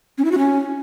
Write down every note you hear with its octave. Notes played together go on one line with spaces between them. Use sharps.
C#4
E4
F#4
C#4